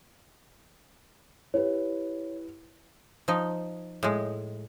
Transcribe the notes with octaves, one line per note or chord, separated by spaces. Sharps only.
E4 G4 B4 C#5
F3 D#4
A2 G#3